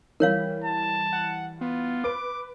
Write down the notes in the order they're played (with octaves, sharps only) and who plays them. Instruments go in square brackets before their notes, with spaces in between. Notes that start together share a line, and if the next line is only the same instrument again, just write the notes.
[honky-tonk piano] E3 G3 [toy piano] A#4 C#5 F5
[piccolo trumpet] A5
[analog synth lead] F#5
[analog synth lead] B3 [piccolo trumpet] F4
[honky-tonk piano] B4 D7 [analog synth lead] D6